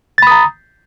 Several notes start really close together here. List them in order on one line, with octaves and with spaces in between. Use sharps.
A6 B5 D#6 A#5